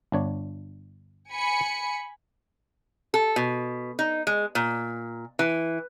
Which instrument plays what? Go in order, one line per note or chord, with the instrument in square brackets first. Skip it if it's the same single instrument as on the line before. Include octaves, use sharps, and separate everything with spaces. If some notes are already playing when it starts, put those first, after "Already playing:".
[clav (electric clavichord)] G1 D4 C#5
[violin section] G#5 B5 C#7
[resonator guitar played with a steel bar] A4
B2
D#4
G#3
A#2
E3